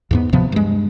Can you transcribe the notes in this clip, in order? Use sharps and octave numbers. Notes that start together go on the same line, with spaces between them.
E2 G#2 B3
D1 C3 F3 B3
G2 G#3